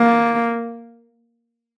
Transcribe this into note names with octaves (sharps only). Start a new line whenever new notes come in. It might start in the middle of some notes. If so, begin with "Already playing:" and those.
Already playing: A#3